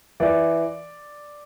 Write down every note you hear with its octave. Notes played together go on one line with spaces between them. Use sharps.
E3 D5